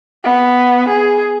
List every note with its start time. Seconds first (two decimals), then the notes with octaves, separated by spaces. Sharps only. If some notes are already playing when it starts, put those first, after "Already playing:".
0.24 B3
0.90 G#4